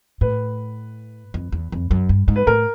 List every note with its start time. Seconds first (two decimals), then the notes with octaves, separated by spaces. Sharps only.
0.21 A2 B4
1.34 F2
1.52 E2
1.72 F2
1.91 F#2
2.09 G2
2.28 G#2
2.36 B4
2.47 A2 A#4